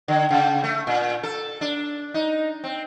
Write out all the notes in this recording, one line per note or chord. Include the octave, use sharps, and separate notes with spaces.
D3
C#3
A3
A#2
A4
D4
D#4
C4